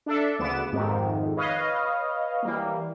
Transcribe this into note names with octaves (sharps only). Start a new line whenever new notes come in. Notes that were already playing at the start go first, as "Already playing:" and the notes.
D4 A4 E5
D2 C#3 B3 D6 E7
F2 G#2 C3 D#3
B4 C#5 D#5 F5
E3 G3 A#3